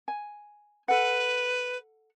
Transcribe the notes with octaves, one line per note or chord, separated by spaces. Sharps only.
G#5
A4 B4 F#5